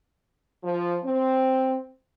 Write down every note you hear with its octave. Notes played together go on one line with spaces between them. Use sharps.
F3
C4